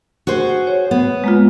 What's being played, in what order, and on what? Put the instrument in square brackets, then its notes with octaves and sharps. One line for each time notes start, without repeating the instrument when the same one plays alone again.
[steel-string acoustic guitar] F#4 G#4 C5
[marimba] C#5
[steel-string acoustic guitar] B3
[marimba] G#3 A#3 F4